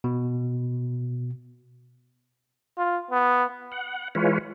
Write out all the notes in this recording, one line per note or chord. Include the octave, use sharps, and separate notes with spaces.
B2
F4
B3
F#5
E3 G#3 F4 B4 C#5